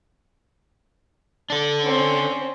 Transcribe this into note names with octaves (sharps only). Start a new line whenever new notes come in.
D4 A4
C4 C#4